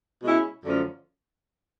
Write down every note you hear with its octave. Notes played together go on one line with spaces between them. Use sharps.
B2 G#3 C#4 E4
F#2 D3 F3 A3 C#4